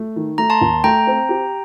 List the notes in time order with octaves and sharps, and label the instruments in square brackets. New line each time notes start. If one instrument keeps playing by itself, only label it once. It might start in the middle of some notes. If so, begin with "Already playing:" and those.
Already playing: [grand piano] A3
D#3
[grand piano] A3 [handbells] A#5
[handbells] A5 C6
[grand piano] D#2
[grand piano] A3 [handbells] G5 A#5
[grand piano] C4
G4